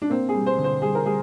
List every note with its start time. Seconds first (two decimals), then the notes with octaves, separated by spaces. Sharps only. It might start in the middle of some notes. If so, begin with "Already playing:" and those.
0.02 D4
0.10 A#3 C4
0.29 G#4
0.34 G3
0.46 C5
0.58 D3
0.64 C5
0.82 G3 G#4
0.95 A#4
1.06 G3 G#4